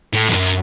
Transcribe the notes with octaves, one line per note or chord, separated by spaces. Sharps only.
A2
F2
F#2